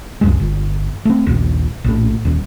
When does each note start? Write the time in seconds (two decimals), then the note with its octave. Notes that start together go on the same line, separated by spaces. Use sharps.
0.21 C2 F#2 G#3
0.40 G1
1.05 A3 C4
1.27 D#1 A#1
1.84 A#1 A2
2.25 D#1